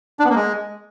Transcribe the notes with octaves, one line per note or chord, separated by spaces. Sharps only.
D4
B3
A#3
G#3